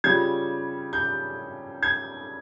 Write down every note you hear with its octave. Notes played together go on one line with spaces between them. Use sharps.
C#3 G3 C#4 F4 G#6
G6
G#6